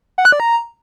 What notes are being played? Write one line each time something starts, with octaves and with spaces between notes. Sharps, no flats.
F#5
F#6
D5
A#5